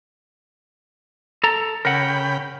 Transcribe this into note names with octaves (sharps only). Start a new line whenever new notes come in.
A4 A#5
C#3 A#4 F#5 G5 B5